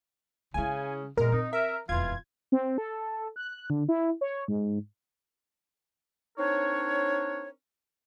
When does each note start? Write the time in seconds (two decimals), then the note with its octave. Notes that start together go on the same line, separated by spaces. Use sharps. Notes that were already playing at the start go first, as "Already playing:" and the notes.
0.54 C#3 G#3 E4 G#5
1.17 E2 A#2 G#3 A#4
1.32 C4 D#4
1.53 A#4 E5
1.89 E1 F2 E3 F4 G#6
2.52 C4
2.78 A4
3.36 F#6
3.70 D3
3.89 E4
4.21 C#5
4.48 G#2
6.37 C4 D4 D#4 A#4 C#5